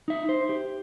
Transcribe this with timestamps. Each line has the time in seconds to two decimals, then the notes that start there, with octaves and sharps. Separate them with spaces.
0.08 D#4 E5
0.29 C5
0.49 G4